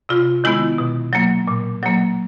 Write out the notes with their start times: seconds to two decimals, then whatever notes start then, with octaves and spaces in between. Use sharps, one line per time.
0.09 C3 F4
0.44 D#3 G#3 B3 E4
0.78 B2
1.13 F#3 A#3
1.48 A#2
1.83 F#3 A#3